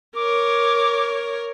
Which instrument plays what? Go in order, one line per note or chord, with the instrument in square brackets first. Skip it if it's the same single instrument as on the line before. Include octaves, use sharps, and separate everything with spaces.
[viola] A#4 C#5 [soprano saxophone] D6